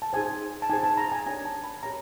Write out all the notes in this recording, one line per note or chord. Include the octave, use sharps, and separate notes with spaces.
A5
D#4 G#4 C5 G#5
A5
D#4 G#4 C5 G#5
A5
A#5
G#5
D4 G4 A#4 C#5 G#5
A5
B5
G4 A#4 C#5 A#5